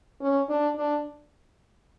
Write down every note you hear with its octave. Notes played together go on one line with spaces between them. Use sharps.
C#4
D4
D4